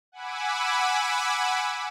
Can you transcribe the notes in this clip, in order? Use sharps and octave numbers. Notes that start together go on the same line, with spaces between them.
F#5 G#5 B5 D6 E6